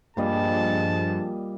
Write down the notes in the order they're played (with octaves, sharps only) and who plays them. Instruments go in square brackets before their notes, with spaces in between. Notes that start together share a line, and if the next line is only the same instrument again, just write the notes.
[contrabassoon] A#1 [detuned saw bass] G2 [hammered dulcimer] A#2 G3 D#5 [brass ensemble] F3 G#4 A5